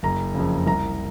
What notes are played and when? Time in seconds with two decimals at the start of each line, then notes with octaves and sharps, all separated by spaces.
0.03 F#1 A#5
0.34 F2 C#3
0.66 C2 A#5